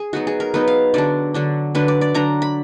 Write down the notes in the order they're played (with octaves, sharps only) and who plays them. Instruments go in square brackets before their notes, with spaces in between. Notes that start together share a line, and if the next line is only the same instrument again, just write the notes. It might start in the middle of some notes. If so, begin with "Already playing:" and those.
Already playing: [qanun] G#4
F#3 B3 D#4 F#4
G#4
A#4
F#3 B3 D#4 B4
F5
D3 F#3 D4 D5
D3 F#3 D4
D3 F#3 D4 B4
D5
D5
D3 F#3 D4 A#5
B5